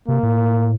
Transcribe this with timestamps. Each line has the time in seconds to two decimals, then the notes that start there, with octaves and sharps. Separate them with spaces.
0.08 C3 A#3
0.23 A2